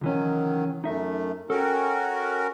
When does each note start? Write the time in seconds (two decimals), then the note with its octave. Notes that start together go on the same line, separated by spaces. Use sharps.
0.01 C#2 D#3 E3 F#3 C#4
0.84 F#2 A3 D#4 E5
1.50 C#4 F#4 A4 A#4 G5